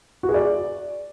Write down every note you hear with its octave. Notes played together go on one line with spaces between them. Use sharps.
F#4
G#4
D5